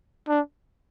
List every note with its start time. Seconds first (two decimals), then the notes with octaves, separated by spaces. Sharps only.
0.28 D4